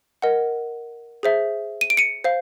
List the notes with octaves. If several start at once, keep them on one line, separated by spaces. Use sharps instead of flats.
A#4 D#5 F#5
G#4 C5 E5
D#7
D7
C#7 D#7
C5 F5